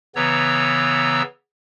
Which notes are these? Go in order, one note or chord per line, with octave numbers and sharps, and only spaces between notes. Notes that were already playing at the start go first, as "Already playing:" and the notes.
C#3 E3 B3 C#5 A#5 E6